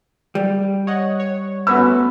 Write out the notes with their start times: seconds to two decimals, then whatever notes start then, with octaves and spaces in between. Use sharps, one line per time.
0.35 G3
0.87 C#5 D#5 F#5
1.20 C#5
1.67 A3 B3 C#4 F#4 B5 E6